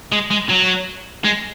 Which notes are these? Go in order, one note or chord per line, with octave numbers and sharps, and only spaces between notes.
G#3
G#3
F#3
G#3